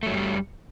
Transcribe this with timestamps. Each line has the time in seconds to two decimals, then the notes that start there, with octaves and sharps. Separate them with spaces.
0.03 A3
0.06 F#3
0.10 F#2
0.14 G3